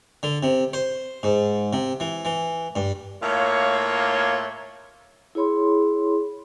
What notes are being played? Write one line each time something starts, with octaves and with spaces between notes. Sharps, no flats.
D3
C3
C5
G#2
C3
E3
E3
G2
A2 A#3 F4 C#5
E4 G#4 C#5 B5 C6